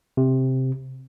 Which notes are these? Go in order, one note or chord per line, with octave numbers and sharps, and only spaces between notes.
C3